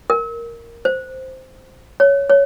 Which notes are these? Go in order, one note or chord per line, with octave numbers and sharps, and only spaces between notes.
A#4
C5
C#5
C#5